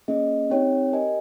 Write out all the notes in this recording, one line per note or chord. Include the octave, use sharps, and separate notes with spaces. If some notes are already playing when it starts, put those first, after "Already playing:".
A#3 C#4 G#4 D#5
C4 D#4 G4 C#5 G5
G4 A#4 D#5 G#5